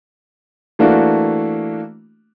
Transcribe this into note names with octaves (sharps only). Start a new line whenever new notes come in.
E3 A3 A#3 D4 F#4